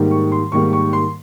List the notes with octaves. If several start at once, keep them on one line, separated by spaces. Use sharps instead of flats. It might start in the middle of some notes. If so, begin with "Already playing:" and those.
Already playing: G#2 D#3 G3 A#3
C#6
C6
G#2 D#3 G3 A#3 C#6
C#6
C6